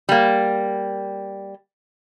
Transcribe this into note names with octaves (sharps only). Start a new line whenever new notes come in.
G3 A#3